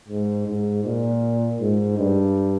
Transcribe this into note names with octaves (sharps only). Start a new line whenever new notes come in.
G#2
G#2
A#2
G#2
G2